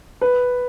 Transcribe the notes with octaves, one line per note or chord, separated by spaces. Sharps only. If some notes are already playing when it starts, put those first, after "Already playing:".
B4